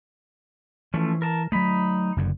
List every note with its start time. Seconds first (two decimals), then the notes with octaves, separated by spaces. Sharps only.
0.94 E3 F3 A3 C#4
1.22 A#4 A5
1.52 F#3 A3 D#4 B5
2.17 F#1 F#2 D3